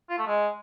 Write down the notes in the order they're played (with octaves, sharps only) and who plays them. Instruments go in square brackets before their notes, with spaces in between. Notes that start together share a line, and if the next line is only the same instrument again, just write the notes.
[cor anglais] F4
A3
G#3